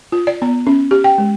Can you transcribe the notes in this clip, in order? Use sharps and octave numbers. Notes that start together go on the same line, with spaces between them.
F4
D5
B3
C#4
G4
G5
G#3